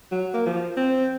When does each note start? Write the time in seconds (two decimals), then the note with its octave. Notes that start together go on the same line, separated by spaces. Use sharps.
0.12 F#3
0.34 A#3
0.46 F3
0.77 C4